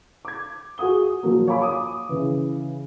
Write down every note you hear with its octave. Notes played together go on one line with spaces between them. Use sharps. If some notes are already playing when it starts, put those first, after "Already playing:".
D6 G#6
F#4 G#4 F#5 D#6 G7
A#2 F3 F#3 A#3
C#5 F5 G#5 B5 D6
D6 D#6
C#3 E3